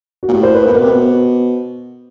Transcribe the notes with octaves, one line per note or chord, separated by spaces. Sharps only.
F#4
A#2
A2 G4
C5
B4
A#2
A#4
B2
B4
C3
B2 C5